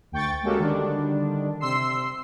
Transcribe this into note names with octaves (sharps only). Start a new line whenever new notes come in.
D2 G5 C#6 A6
G#3 A#3 C#4 F#4 G4 A4
D3 D#3 G3 D4
C3 C6 E6 C7